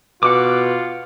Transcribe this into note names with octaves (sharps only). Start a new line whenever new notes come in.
B2 F4 F#5 D6